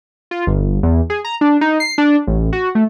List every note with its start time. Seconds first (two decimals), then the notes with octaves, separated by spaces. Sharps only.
0.31 F4
0.47 G1
0.83 E2
1.10 G#4
1.25 A#5
1.41 D4
1.61 D#4
1.80 C7
1.98 D4
2.27 A1
2.53 F#4
2.75 A3